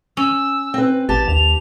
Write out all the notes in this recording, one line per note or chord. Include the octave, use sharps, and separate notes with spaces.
C#4 E6
C4 B4
A1 G4 A5 A6
D#2 F7